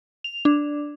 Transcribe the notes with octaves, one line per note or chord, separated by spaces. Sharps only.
F7
D4